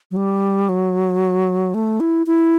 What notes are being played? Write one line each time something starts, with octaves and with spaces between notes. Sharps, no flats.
F#3
G3
F#3
A3
E4
E4